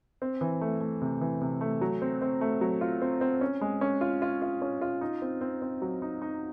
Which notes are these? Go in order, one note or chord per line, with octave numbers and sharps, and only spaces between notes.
C4
E3
A3
A3
C3
E3
C3
A3
F#3
C4
C4
A3
F#3
F4
C4
C4
C#4
G#3
C#4
F4
F4
F4
C#4
F4
D#4
C4
C4
C4
F#3
D#4
D#4